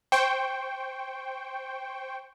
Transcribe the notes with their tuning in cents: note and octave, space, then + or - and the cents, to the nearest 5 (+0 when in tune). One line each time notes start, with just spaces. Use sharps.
C5 +5 G5 +0 C#6 +0